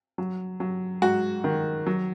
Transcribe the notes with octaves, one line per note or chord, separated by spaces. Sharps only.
F#3
F#3
G#2 F#4
D#3
F#3